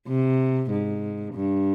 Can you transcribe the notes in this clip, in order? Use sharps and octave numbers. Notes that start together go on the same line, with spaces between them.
C3
G#2
G2